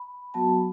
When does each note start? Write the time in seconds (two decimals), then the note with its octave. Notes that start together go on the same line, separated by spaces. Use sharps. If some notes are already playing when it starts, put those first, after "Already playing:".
Already playing: B5
0.34 F#3 B3 F#4 A5
0.47 B5